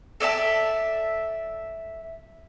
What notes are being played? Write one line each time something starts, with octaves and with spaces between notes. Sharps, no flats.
A4 D5 E5 A5